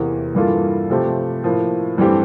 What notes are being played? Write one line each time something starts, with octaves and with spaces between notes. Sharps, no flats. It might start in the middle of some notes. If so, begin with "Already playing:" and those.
Already playing: E2 C3 E3 A#3
G2 E3 A#3 F4 A4
C3 F3 A3 C4 G4
A2 F3 A#3
G2 E3 A3 C4 G4